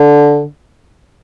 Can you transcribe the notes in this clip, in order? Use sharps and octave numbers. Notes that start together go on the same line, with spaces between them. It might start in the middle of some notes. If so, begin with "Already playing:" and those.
Already playing: D3